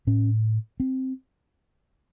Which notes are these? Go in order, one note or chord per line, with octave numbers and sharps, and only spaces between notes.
A2 C#4
C4